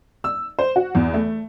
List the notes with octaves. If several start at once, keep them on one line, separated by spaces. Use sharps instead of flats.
E6
C5
F#4
E2
A3